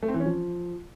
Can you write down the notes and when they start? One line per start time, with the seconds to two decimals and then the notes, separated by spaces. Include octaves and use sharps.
0.03 A3
0.08 C4
0.14 E3
0.20 C#4
0.26 F3